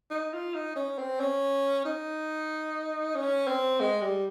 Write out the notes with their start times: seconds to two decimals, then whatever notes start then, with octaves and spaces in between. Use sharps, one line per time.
0.11 D#4
0.33 F4
0.54 D#4
0.76 C#4
0.98 C4
1.20 C#4
1.85 D#4
3.15 C#4
3.47 C4
3.80 G#3
4.01 G3